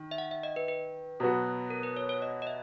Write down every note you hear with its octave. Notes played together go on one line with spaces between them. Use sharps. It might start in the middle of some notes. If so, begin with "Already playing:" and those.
Already playing: D#3
E5
F#5
E5
D#5
B4
B4
B2 F#3 B3 F#4
A#4
B4
C#5
C#5
D#5
D#5
E5